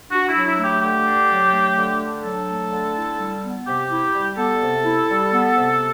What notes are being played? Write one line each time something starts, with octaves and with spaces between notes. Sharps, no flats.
D4 F#4
E4
F#3
E4
A3
G4
D3 G4
D4
F#3
A3
D3
D4
F#3 A4
A3
D3
E4
G3
B3
C3 G4
E4
G3
B3 A4
C3
E4
G3
B3
C3